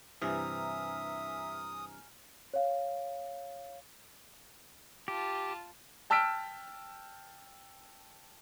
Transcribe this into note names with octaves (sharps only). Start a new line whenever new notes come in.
G2 C3 E3 E5 G#5 A#5 D#6 F6
C#5 F5
F4 G4 A5
G5 A5 E6 F6 B6 D7